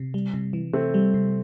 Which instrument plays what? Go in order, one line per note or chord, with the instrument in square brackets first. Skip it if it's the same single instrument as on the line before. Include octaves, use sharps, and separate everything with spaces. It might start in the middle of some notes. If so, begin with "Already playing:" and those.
Already playing: [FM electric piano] C3
G3
C3
E3
[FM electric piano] C3 [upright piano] A3 C4
[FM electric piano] G3
C3